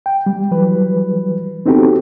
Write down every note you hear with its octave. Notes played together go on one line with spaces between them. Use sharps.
G5
G3
E3 F#3 G3 B4
B3 C4 D#4 F#4 G4 A4